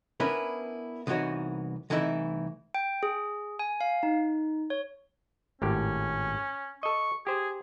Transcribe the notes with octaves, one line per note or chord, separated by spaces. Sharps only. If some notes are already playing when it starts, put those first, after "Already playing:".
B3 C#4 D4 E4 A#4 B4
C2 E3 B3 D#4 F#4 C#5
C2 E3 A3 D#4 E4 E5
G5
G#4
G#5
F5
D#4
C#5
G#1 A2 C#4 G4
A4 D#5 C#6
G4 G#4 C5